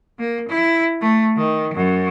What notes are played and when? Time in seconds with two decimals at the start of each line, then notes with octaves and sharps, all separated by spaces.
0.19 A#3
0.48 E4
1.01 A3
1.37 D#3
1.74 F#2